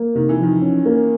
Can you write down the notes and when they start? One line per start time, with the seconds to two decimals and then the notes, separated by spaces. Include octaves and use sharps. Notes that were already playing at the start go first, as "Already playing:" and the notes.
Already playing: A#3
0.15 C3 D#3
0.29 E3
0.39 D#3 F3
0.62 C#4
0.86 A#3